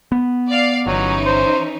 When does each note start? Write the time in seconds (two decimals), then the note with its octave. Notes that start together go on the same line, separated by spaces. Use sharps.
0.12 B3
0.49 D5 F5
0.86 G1 E3 F#3 C#4 D#4
1.26 C5